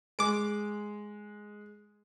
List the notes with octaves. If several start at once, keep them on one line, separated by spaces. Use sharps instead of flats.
G#3 D6 D7